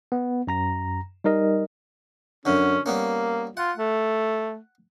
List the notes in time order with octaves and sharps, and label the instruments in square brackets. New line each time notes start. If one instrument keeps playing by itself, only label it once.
[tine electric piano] B3
F#2 A#5 A#6
G3 D#4 A#4 D#5
[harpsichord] F#2 D3 [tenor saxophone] C#4
[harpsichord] G3 B3 C#4 [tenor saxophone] A#3
[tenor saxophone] F4 [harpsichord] F#5
[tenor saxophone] A3